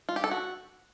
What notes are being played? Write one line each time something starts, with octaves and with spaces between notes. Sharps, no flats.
F4
G4
A4
F#4